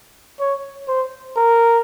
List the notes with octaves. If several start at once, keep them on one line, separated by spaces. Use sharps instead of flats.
C#5
C5
A#4